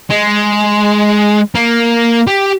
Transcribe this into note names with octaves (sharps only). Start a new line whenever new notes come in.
G#3
A#3
G4